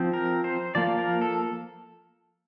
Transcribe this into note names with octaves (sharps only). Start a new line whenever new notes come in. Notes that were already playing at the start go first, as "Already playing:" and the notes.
Already playing: F3 C4
A#4
C5
F3 A#3 D5
A#4
A4